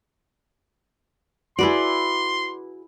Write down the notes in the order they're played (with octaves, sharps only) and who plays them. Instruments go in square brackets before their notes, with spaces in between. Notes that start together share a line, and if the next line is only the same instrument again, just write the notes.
[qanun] E4 B4 D5 [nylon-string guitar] F#4 G#4 [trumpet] C6